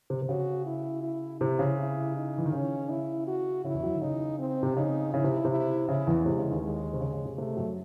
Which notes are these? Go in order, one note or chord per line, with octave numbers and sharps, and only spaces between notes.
C3
C3
C#3 F#4
E4
E4
C3 E4
C#3
E4
D#4
E3
D#3
C#3 C#4
E4
F#4
C#3 E4
E2 E3
F#2 F#3
D#3
C#3 D#4
C4
C3
C#3 D#4
C#3 E4
C3
C3
E4
C#3 E4
E2 E3
C3 G#3
C#3
D#2 D#3
G#3
C3
C#3
C#3
C3
C3 A3
F#2 F#3